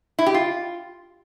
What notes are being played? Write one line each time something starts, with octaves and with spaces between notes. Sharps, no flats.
E4
G4
F4